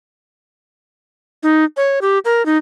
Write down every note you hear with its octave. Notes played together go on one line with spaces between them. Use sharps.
D#4
C#5
G4
A#4
D#4